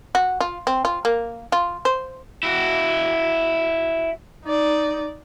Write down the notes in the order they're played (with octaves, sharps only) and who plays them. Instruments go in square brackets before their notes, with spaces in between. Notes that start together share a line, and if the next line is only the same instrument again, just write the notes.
[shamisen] F#4
F4
C4
F4
A#3
F4
C5
[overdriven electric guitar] E4 F#4
[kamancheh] D#4 D5